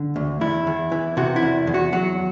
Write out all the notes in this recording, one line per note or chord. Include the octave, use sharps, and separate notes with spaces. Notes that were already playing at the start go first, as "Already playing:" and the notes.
Already playing: D3
D2
E2 E4
E2
E3
C3 F#4
E4
E2
E2
F#4
F#3 F#4